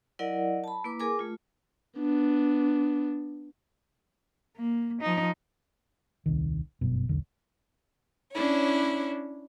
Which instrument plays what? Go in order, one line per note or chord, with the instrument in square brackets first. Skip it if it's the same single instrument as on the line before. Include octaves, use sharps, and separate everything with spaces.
[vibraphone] F#3 E4 A#4 D5 D#5 F#5
A5 B5
A#3 E4 B4 D6
G#4 A#4 G#5 D6
A3 F4
[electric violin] B3 D4
[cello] A#3
F3 D#4
[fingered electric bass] D#1 C2 D#3
G1 F#2 B2
E1 B1 D3
[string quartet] C#4 D4 E4 C#5